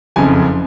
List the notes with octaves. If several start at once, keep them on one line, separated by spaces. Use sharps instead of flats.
F#1 F2 C#3 G#5